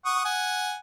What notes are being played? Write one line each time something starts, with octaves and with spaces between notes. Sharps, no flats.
F#5 C#6 D#6
F#5 G#5